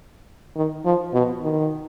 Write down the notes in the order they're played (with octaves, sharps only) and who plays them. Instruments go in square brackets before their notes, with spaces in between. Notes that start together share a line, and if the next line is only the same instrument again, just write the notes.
[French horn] D#3
F3
B2
D#3